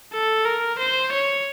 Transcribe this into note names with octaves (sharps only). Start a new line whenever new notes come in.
A4
A#4
C5
C#5